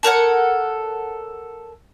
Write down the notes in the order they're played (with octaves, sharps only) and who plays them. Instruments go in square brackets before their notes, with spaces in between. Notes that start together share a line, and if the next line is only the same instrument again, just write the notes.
[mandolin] A4 A#4 C#5 F#5